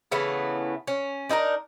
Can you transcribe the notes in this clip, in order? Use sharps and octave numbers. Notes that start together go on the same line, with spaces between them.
C#3 E3 A3 B3
C#4
D4 D#4 A4 A#4